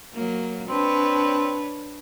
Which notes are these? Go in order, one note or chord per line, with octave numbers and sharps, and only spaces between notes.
F#3 A#3
C4 D4 B4 C#5